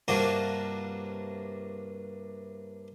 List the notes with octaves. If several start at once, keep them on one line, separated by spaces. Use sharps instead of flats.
G2 C3 A#3 D4 F4 F#4